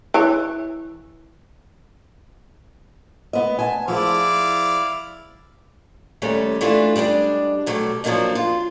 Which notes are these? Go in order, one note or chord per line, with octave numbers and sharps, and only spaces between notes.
E3 C#5
B3 D#5
G#5 A5
F3 E4 G#4 D5 F5
D#2 G3 A3 C#4
E3 A3 D4 F4
G3 G#3 C4 D4
B2 F#3 G3 A3
F3 F#3 G#3 A#3 D4 D#4
F4